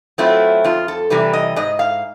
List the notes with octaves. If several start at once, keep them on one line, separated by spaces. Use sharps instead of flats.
F#3 A3 C4 E4 F4
F2 F4
A4
C3 E3 G3 B4
D#5
G#2 D#5
F5